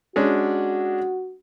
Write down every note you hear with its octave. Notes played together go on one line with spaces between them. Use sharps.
G#3 C#4 D4 F#4